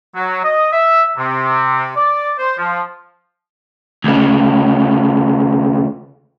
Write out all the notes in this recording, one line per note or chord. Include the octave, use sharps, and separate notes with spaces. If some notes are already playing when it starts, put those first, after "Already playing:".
F#3
D#5
E5
C3
D5
C5
F3
D2 C#3